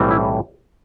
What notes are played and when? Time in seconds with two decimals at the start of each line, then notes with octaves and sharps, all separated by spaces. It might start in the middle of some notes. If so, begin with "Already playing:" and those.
Already playing: B1 A2 E3 G3 C4
0.11 E4